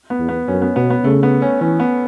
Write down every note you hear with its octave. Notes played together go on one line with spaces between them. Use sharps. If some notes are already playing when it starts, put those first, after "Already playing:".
B3
E2
B3
F#2 C#4
B3
B2 B3
B3
C#3 A3
B3
C#4
E3 C#4
B3